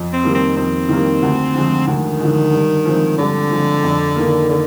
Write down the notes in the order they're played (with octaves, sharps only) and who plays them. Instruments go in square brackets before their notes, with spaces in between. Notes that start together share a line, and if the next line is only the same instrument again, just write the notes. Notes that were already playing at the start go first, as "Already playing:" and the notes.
Already playing: [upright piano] F2
[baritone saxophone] C4
[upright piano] D#3 G3 A#3
[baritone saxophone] C4
[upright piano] F2 [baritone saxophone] C4
[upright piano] D#3 G3 A#3
D2
D3 F3 G#3
[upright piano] D2 [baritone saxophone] D#3
[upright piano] D3 F3 G#3
G2
F3 G#3 C4
[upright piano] G2 [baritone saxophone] D3
[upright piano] F3 G#3 C4
F2
D#3 A#3
[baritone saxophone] D3